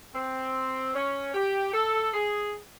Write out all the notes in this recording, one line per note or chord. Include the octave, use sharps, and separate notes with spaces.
C4
C#4
G4
A4
G#4